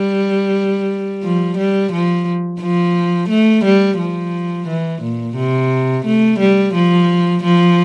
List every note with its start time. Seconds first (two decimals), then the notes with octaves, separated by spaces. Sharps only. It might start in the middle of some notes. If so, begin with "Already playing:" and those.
Already playing: G3
1.23 F3
1.57 G3
1.92 F3
2.61 F3
3.29 A3
3.64 G3
3.99 F3
4.67 E3
5.02 A#2
5.36 C3
6.06 A3
6.39 G3
6.74 F3
7.43 F3